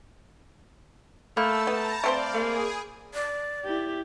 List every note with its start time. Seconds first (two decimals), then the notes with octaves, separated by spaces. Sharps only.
1.37 A3 A#3 A5 B5 E6 G6
1.67 B3 A5 A#5
2.04 A3 C4 C5 D5 F5 D7
2.34 A#3 G#4
3.14 D5
3.65 E4 G4